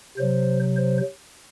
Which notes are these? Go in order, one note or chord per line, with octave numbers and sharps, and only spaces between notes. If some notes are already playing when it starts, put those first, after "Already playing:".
C3 F#3 C5
C5